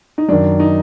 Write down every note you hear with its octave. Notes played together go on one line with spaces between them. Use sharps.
D#4
F#2 D#3 D4
D#4